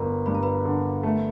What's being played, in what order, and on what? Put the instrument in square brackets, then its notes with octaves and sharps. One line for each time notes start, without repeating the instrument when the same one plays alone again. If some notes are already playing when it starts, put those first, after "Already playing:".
Already playing: [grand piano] G1 [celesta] A#4 B4 A#5 B5
[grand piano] G2 [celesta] B5
[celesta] A#5
B4 B5
[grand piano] D3
A3